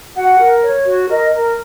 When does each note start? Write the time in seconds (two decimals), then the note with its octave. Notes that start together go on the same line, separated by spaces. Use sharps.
0.16 F#4 F#5
0.39 A#4
0.62 C#5
0.86 F#4
1.11 A#4 D#5
1.34 A#4